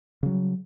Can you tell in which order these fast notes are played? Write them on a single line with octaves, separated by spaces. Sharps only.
C#3 F#3 G3